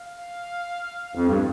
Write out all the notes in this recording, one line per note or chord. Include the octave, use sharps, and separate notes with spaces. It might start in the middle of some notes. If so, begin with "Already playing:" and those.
Already playing: F5
F2
G2